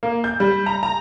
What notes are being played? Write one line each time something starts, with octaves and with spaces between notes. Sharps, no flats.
A#3
G6
G3
A#5
A#5